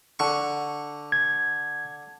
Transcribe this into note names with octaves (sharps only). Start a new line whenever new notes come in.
D3 C#6
G#6